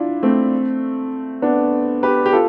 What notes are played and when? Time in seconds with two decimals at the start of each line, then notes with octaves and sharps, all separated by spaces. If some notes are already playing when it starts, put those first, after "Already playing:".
Already playing: D4 E4 F4
0.23 A3 C4
1.42 B3 D4
2.03 G4 B4
2.26 G4
2.33 F4 A4